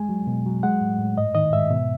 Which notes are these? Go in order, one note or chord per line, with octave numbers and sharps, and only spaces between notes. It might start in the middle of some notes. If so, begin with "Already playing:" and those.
Already playing: G#3 G#5
F#3
B2
F#3
G#3 F#5
A2
A2
G#2 D#5
D#3 D#5
G#2 E5
B2